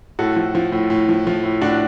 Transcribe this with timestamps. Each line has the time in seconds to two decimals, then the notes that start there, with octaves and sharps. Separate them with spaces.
0.19 A2 F#4 A4
0.36 F3
0.55 F3
0.72 A2
0.90 A2
1.09 F3
1.27 F3
1.44 A2
1.62 A2 D4 F#4